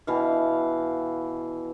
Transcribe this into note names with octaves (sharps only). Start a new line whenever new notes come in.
B2 E3 F5